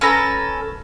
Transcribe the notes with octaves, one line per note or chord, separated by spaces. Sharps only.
C#4 A4 B4 A#5